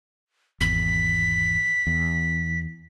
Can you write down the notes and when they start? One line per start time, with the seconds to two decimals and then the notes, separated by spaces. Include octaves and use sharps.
0.61 G#1 E2 B6
1.87 E2